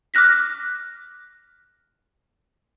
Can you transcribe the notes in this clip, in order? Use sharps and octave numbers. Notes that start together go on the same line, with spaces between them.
D6 F6 F#6 A#6 B6